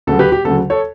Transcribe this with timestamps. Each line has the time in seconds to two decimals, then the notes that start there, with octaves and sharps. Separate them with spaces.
0.07 D2 C#3 F#3 A4
0.19 G4 B4
0.32 G4
0.45 D2 C#3 F#3 A4
0.70 A4 C#5